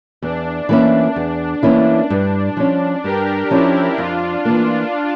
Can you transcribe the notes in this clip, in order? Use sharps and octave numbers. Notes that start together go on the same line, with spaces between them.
E2 D4
E3 A#3 C#4 E4
E2
E3 A#3 C#4 E4
G2
F3 C#4
G2 G4 A#4
F3 C#4 E4 G4
F2 D4 F4
E3 A#3 D4